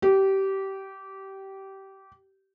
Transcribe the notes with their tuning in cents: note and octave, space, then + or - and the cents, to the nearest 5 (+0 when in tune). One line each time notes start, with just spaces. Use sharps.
G4 -20